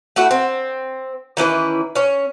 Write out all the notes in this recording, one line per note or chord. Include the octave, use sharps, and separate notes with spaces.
A3 E4 F#4
C4
D#3 E3 C#4 B4
C#4 C#5